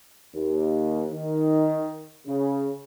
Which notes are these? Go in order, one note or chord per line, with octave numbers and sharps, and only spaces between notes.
D#2
D#3
C#3